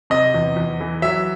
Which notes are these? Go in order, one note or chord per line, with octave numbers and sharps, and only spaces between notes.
C3 D#5
E2
E2
E3
F#3 E5